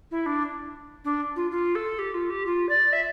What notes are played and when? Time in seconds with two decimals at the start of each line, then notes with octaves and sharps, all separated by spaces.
0.11 E4
0.26 D4
1.05 D4
1.36 F4
1.51 F4
1.75 A4
1.99 G4
2.14 F4
2.30 G4
2.46 F4
2.69 D5
2.93 E5